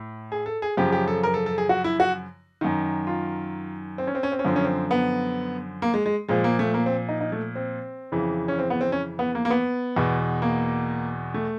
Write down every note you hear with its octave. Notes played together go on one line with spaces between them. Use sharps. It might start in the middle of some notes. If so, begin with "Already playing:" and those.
Already playing: A2
G#4
A4
G#4
F#2 C#3 F3 G4
G4
A4
A#4
A4
A4
G#4
F#4
E4
F#4
F#2 D#3
F4
C4
C#4
C4
C#4
C4
C#4
F#2 D3 F3 C4
C#4
C4
B3
A#3
G#3
G#3
A#2 F3 G#3
A#3
A3
A#3
C4
D#4
D#4
A3
C4
F2 C#3 E3
C#4
C4
B3
C4
C#4
B3
A#3
A#3
B3
E2 B2
A#3
A3